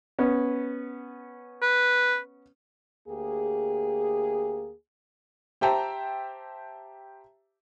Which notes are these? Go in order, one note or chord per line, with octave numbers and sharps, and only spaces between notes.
B3 C#4
B4
D2 A#3 G4 G#4
G4 C5 E5 G5 A5 A#5